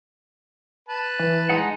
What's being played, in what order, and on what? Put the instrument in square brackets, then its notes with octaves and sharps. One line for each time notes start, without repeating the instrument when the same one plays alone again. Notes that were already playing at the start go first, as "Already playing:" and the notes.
[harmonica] B4 A5
[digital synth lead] E3
[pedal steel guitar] G#3 D#4 F#5